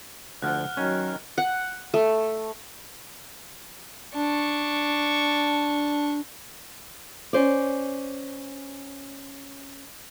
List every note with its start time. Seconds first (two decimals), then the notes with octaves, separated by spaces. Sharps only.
0.42 D2 F3 F#5 F6 F#6
0.77 D#3 F#3 C#4
1.38 F#5
1.94 A3
4.14 D4 C#6
7.33 C#4 C5 D5